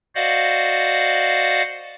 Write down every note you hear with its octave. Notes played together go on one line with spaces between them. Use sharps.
F#4 C5 D5 D#5 F5 F#5